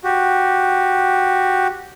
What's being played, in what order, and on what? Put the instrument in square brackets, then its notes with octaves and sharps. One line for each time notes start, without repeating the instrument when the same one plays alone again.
[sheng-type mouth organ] F#4 G4